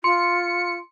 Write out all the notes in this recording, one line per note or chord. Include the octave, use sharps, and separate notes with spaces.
F4 C6 C#7